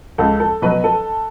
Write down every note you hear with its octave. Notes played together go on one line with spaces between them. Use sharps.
C#2 A4
A4
B2 F#3 B4
A4